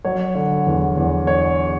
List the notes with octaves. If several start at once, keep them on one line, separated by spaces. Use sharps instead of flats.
F#3 C#5
D3
E2
E2
C#5